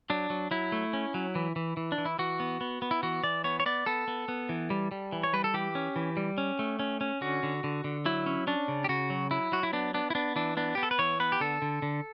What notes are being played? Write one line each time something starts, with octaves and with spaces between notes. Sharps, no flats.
F#3 D4
F#3
F#3 E4
A3
C#4
F#3
E3
E3
E3
D4
E3
E4
E3 F#4
B3
B3
B3
E4
E3 F#4
E3 D5
B3 C#5
C#5
B3 D5
B3 A4
B3
B3
E3
G3
G3
E3
C#5
G3 B4
A4
E3 G4
C#4
E3
G3
C#4
A3
C#4
C#4
D3 F#4
D3
D3
D3
F#3 E4
C#4
C#4 D4
C#3
G4
C#3 F#4
F#3
F#3 E4
F#3 F#4
E4
B3 D4
B3 D4
E4
B3 D4
E3 D4
B3 D4
B3 G4
A4
B4
E3 C#5
B3 B4
G4
D3 A4
D3
D3